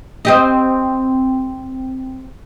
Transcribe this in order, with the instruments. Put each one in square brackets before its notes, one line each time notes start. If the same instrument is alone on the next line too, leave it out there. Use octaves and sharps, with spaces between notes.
[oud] C4 G4 D#5